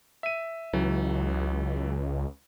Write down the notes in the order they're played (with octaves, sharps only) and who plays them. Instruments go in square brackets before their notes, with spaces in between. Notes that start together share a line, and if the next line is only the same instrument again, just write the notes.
[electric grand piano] E5 D#7
[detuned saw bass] C#2 [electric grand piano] E3 F#3